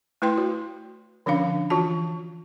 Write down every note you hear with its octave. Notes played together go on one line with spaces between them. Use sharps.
A3 E4 B4 G5 C6
F#4
D3 F3 C#4 D4 F5
E3 F4 F#4 A5